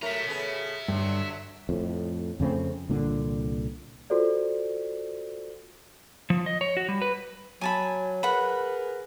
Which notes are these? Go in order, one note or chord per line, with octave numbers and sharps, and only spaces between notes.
F#3 A3 A#4 E5 A#5
C#3 B3 A4
G2 D3 F#3
F2 A2
F2 C#3 A3 C4
C2 A#2 D3
F4 F#4 A4 C5 D5
F3
D#5
C#5
F#4
G3
B4
F#3 G#5 A5 B5
G#4 A#4 B4 F#5 B5